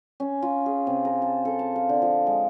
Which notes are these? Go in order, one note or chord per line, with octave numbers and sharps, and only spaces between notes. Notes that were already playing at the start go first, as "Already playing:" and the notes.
C#4
F4
G#4
C3
A#4
A5
A4
A5
F5
D3
F3
G#3